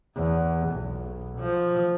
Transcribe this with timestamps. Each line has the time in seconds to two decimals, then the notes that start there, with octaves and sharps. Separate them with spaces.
0.15 E2
0.70 B1
1.39 F3